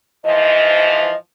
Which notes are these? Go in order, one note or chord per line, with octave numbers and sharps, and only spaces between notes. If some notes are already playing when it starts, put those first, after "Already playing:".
G#2 E3 F3 D#5